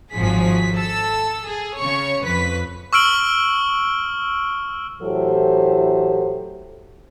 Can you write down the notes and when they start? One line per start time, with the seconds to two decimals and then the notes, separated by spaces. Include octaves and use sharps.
0.12 G#1 F3 F#3 G#4 B6
0.76 A4 A5 E6
1.47 G#4
1.79 C#3 C#5 C#6
2.24 F2 B4 B6
2.93 C#6 E6 F6 D7 F#7
5.02 A2 E3 F#3 G4 A4 C5